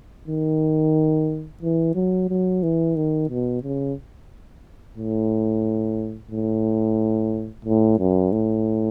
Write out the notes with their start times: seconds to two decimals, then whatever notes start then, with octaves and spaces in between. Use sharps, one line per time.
0.28 D#3
1.62 E3
1.95 F#3
2.29 F#3
2.63 E3
2.96 D#3
3.29 B2
3.63 C#3
4.97 A2
6.31 A2
7.65 A2
7.99 F#2
8.32 A2